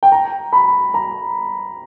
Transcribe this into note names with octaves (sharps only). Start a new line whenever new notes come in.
G5
A#5
B5
A#5